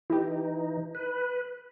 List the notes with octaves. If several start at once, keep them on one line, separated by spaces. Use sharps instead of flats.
E3 D#4 E4 G4
B4